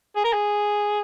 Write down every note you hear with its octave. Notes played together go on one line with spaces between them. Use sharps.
G#4
A#4
G#4